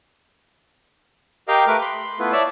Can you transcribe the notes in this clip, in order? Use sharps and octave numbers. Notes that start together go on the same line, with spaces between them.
G4 A#4 D#5 F5 G5 F6
A3 A#4 B4 D6
B5 C6
A3 B3 E4 F4 B4
C#5 D5 E5 A5 E6